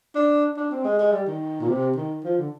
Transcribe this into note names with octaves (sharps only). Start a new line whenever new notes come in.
D4
D4
C4
G#3
G#3
G3
D#3
A#2
C3
D#3
F3
D3